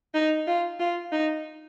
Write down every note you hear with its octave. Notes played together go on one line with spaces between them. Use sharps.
D#4
F4
F4
D#4